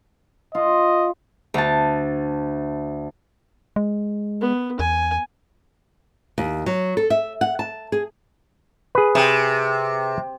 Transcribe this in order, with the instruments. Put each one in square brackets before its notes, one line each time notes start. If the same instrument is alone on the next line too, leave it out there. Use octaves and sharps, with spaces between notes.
[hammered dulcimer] F4 [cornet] D#5
[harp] D2 A5
[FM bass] G#3
[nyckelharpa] B3
[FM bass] E2 [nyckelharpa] G#5
[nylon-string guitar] D#2
F#3
A4
E5
F#5
A5
G#4
[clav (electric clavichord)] G#4 B4
[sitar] C3